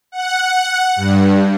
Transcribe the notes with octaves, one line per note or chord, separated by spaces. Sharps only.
F#5
G2